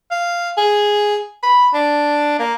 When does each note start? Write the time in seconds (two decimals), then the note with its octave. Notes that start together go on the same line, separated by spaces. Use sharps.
0.11 F5
0.57 G#4
1.43 B5
1.74 D4
2.39 A#3